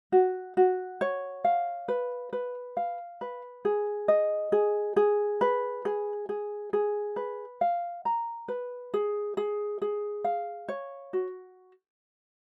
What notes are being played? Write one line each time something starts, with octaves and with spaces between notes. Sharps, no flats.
F#4
F#4
C#5
F5
B4
B4
F5
B4
G#4
D#5
G#4
G#4
B4
G#4
G#4
G#4
B4
F5
A#5
B4
G#4
G#4
G#4
F5
C#5
F#4